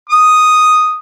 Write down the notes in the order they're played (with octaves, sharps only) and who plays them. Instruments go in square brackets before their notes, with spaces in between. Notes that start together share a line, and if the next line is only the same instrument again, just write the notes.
[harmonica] D#6